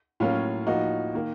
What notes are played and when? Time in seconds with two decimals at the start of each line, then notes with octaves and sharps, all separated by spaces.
0.20 A2 F#3 A#3 C#4 F4
0.67 A2 F3 A#3 D#4 F#4
1.14 D#3 A#3